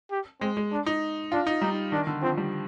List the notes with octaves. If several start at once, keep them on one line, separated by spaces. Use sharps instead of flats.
G4
G#3 C4
G#3
D4
D#4
D4 F4
D#4
G3 D#4
D#3 D4
D3
F3 C4
G3